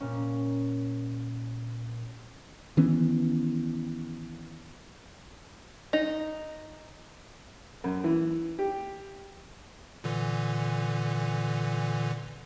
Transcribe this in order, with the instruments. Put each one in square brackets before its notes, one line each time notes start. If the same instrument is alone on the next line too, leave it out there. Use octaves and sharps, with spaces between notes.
[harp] A#2 C#4
[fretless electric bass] D#3 E3 B3 C#4
[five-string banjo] D#4
[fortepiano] F#2
E3
G4
[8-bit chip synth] A#2 D3 E3